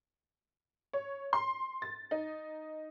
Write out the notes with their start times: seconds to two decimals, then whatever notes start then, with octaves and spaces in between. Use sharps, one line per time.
0.93 C#5
1.33 C6
1.82 A6
2.11 D#4